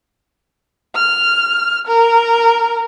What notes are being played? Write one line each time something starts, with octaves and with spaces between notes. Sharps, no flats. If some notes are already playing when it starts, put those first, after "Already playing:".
F6
A#4